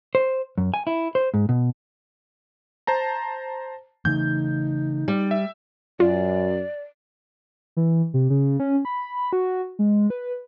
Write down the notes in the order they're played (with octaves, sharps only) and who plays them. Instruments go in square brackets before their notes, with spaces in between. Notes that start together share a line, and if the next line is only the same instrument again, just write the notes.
[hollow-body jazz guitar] C5
F#2
G#5
E4
C5
G#2
B2
[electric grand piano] C5 A5 A#5
[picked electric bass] C#3 E3 A3 [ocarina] D#4 [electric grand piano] G6
[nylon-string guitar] G3
[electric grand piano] E5
[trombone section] F#2 [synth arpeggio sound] F4 [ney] D5
[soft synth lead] E3
C3
C#3
C#4
B5
F#4
G#3
B4